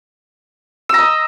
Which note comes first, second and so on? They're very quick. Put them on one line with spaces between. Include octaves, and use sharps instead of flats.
E6 A#5 D#5